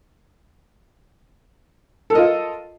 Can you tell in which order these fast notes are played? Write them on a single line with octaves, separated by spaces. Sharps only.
A4 A#4 D#5 F4